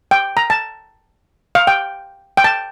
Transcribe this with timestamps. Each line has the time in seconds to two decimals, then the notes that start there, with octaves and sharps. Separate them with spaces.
0.11 G5
0.37 A#5
0.50 A5
1.55 F5
1.67 G5
2.37 G5
2.44 A5